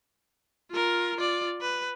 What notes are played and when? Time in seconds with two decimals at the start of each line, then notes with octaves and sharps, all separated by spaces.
0.71 F4 A#4
1.16 F4 D5
1.61 B4